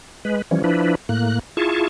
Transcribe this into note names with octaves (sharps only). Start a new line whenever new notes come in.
G#3 B4
E3 F3 G3 C#4
F3 D4 E4 B4
A2 A#3 F#6
E4 F4 G#4 A5 C#6